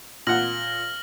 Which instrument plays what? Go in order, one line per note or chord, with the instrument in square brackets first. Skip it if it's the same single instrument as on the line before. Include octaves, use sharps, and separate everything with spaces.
[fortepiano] A#2 F#5 [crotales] F6 A#6 F#7